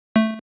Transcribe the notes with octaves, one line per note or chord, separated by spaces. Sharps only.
A3